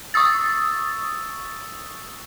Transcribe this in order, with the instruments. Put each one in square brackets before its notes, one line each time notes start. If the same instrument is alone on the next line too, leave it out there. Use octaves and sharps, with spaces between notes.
[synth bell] C#6 D#6 E6 A6